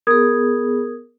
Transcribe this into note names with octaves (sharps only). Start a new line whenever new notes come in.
B3 G#4 A#4 D#6 G#6